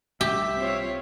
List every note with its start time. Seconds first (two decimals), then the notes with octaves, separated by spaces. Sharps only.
0.21 C2 G4 E5
0.56 C4 F4 C#5